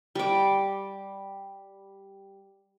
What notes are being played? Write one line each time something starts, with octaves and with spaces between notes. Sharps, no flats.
G3 D6